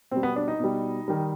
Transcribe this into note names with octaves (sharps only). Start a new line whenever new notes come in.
B2 G3 C4
B3
D4
D#4
B2 G3
D#3 G3